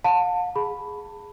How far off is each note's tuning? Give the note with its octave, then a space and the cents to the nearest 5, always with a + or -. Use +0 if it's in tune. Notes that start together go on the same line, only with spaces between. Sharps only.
F5 +45 A5 +20
G#4 +0 B5 +0